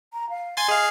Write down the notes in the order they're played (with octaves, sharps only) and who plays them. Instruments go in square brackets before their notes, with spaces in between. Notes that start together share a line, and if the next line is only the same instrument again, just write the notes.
[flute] A#5
F5
[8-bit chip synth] G#5 C6 A6
[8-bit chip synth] G#4 F5 [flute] D#5